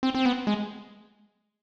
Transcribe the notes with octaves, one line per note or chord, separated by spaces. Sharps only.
C4
C4
B3
G#3